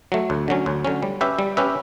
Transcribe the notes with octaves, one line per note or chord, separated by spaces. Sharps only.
F#3 A3
D2
D3 F#3 C#4
D2
D3 F#3 C#4
G3
C#4 G4 B4 E5
G3
C#4 G4 B4 E5